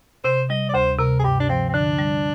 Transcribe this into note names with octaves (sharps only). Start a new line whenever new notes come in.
C3 C5
G3 D#5
D5
D2 C5
C3 A#4
G#4
G2 G4
D4
F3 C4
C4
D3 D4
G3